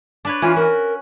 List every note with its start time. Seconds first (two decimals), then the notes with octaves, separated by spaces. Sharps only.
0.25 D4 B4 C#5
0.42 E3 C#4 F4
0.56 F#4 A#4